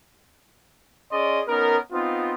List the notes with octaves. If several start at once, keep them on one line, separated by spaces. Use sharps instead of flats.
C#4 G#4 D5 D#5 C6
B3 C#4 D#4 A#4
B3 C4 D#4 F4